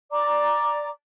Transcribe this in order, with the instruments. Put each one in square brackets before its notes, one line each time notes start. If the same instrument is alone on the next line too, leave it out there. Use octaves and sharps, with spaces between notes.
[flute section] D5 A#5 D6